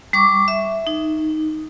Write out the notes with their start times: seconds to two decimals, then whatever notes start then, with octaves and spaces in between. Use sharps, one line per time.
0.13 G3 C#6 D6
0.48 E5
0.87 D#4